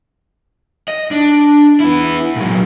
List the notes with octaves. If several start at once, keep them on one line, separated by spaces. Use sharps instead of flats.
D#5
D4
B3 E4
A#2 F#3